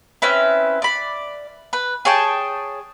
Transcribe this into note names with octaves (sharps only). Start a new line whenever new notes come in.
C4 C#4 E4 B4
D5 B5
B4
G#4 C#5 G5 A5